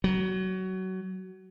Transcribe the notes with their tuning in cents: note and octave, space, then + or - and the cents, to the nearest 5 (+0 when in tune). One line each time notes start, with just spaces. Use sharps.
F#3 +20